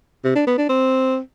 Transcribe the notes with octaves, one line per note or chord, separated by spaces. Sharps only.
C3
D4
B3
D4
C4